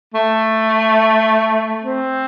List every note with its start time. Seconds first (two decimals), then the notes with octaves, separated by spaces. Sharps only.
0.14 A3
1.83 C4